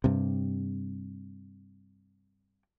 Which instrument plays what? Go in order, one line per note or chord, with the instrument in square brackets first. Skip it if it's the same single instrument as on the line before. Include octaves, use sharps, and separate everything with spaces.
[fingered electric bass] G2 C3